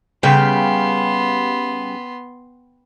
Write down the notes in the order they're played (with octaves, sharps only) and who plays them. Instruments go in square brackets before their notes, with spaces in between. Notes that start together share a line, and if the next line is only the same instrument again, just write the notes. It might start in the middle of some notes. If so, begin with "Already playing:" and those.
[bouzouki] C#3 G3 F5 [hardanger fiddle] B3 C6 [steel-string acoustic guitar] G5